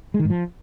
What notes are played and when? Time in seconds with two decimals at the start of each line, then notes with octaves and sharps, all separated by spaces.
0.14 G#3
0.19 D#3
0.25 G#2
0.30 F3